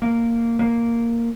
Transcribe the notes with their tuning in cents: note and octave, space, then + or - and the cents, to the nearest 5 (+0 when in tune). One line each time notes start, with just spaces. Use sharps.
A#3 -10
A#3 -5